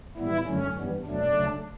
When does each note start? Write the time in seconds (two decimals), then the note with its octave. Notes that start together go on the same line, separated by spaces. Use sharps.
0.17 A2 E3 G3 B3 E4
0.46 F#2 D3 F#3 A3 C#4
0.75 G2 E3 G3 B3
1.04 E2 B2 F#3 A3 D4
1.34 D2 C#3 F#3 A3